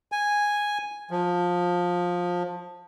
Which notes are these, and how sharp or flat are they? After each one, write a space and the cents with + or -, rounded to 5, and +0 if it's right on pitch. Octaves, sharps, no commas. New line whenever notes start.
G#5 -5
F3 +20